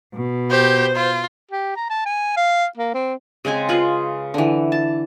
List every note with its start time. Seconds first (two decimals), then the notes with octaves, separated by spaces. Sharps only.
0.15 B2
0.51 G4 C5
0.96 F4
1.51 G4
1.76 A#5
1.90 A5
2.05 G#5
2.37 F5
2.77 A#3
2.94 C4
3.45 C#3 G#3 C4 G#5
3.69 F4 G#4 B4
4.34 D3 E3
4.72 A5